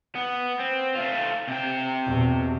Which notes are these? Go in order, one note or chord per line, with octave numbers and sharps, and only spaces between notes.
B3
C4
A3 F4
C3 G5
E2 B2